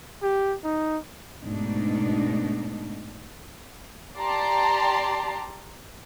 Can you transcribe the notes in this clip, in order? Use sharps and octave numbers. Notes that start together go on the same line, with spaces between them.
G4
D#4
G#2 B2 A3 D4 D#4
G4 D5 A5 A#5 C6